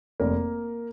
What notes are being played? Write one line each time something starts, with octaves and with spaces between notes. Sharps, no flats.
F1 A#3 A#4